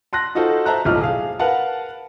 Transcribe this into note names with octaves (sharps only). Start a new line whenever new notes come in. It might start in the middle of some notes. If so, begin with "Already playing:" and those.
A5 C6 F#6 A#6
D#4 F4 F#4 A4 C5
C5 E5 A5 A#5 F#6
D#1 B1 A2 E4 F4 F6
G#4 F5
A#4 B4 F5 F#5 A5